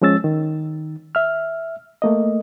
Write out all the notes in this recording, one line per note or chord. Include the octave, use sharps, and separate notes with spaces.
F3 G#3 C#4 E6 A6
D#3
E5 F6
A3 A#3 D#5